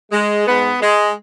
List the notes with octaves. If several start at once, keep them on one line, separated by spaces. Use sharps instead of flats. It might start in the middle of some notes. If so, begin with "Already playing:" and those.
G#3
G#2 G#3 B3
G#3